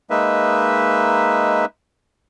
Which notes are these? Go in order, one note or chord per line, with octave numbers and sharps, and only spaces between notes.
G#3 A#3 D#4 B4 E5